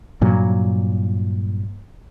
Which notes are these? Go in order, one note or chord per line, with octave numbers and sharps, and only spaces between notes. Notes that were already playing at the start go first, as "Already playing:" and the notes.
G2 A#2 F#3